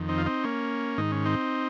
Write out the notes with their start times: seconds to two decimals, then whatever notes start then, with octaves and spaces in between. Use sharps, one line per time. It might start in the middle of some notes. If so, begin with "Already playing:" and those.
Already playing: F2 D#3
0.09 C4 D#4
0.18 F4
0.26 C4 D#4
0.43 A#3 C#4
0.98 G#2 D#3 D#4
1.12 C#4
1.25 C4 D#4